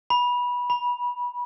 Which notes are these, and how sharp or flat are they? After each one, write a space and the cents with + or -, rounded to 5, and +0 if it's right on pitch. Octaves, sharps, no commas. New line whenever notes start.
B5 -15
B5 -25